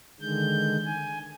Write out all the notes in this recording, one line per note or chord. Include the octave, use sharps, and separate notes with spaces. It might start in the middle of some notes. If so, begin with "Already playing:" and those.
D3 D#3 G#3 G6
G#5